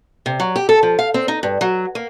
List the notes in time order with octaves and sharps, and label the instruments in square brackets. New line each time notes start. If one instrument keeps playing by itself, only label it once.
[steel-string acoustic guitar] C3
F#3
G4
A4
F3
F5
C4
D#4
G2
F#3
A#3